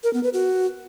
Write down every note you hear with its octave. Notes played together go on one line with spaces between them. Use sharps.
A#4
B3
B4
F#4